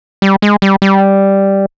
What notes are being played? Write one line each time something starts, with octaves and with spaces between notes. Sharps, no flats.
G3
G#3
G3
G3